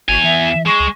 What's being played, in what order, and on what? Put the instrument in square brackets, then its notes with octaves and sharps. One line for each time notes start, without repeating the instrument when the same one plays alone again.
[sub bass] G#1 [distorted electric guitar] E2 G#5 [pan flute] F#4 [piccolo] F7
[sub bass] E3 [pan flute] E5
[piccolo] E7
[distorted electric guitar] G#3 [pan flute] C#6 [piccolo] E7
[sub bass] C#2